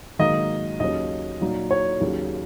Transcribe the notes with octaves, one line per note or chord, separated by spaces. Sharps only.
G#2 D#3 F#3 A#3 D#5
D#2 C#3 F#3 C#4 D#5
A#2 F#3 D#4
C#5
D#2 C#3 F#3